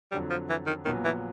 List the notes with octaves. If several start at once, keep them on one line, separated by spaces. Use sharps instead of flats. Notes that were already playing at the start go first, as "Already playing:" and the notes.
F2 D3 F#3 G3
F3
E3
D#3
A#1 A#2 D#3 F#3 B3
E3